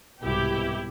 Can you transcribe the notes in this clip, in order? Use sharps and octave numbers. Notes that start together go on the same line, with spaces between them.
C2 G#2 B2 E4 G4